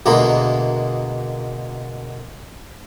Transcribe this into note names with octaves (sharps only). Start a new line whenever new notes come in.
D2 B2 G#3 A#3